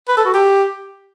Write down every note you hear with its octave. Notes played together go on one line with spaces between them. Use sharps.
B4
A4
F#4
G4